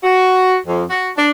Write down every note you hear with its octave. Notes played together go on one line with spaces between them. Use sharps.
F#4
F2
F#4
D4